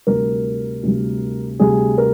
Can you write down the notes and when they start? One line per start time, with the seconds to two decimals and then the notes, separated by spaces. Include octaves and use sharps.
0.07 D2 C3 G3 A#4
0.83 D2 C3 G3
1.59 D2 C3 G3 G#4
1.98 A#4